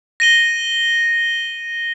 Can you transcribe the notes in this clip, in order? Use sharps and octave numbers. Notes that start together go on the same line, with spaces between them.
A#6 D#7 G7